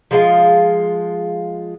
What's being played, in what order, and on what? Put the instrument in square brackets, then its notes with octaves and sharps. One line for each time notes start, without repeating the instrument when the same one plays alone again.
[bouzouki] F3 G#3 F4